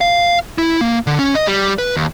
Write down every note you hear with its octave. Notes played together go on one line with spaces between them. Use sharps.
F5
E4
A#3
D3
C#4
D#5
G3
B4
D#2